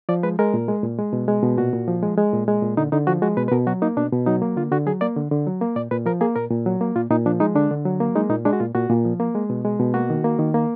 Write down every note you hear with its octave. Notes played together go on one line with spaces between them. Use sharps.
F3 D5
G#3 B4
G#3 A#4
A#2
G#3
A#2
G#3
B2
G#3
B2
A#2 F#4
A#2
F3
G#3
G#3
A#2
G#3
A#2
D3 D#4
D3 D#4
F3 F#4
G#3 F#4
B2 B4
B4
B2 A#4
F#3 F#4
A#3 D#4
B2 D4
B2
F#3 D#4
A#3
D3 F4
D3 F#4
F#3 G#4
A#3 D5
D3
D3
F#3
A#3
A#2 D5
A#2 B4
F3 A#4
A#3 G#4
A#2 A#4
A#2
F#3
A#3
A#2 F4
A#2 D#4
F3 D4
G#3 D#4
D3 D4
D3
F#3
A#3
G#3 D#4
A#2 D#4
G#3 D4
F#4
A#2 F4
A#2 F#4
A#2
F3
A#3
G#3
B2
G#3
B2
A#3 F#4
D#3
A#3
D#3
A#3